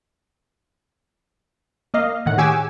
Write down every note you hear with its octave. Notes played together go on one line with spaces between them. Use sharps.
A#3 D#5 F5
A2 D#3 F#5
G4 G#4 C#5 G#5 D6 E6